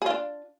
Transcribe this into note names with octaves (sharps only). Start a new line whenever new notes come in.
D4 F4 G#4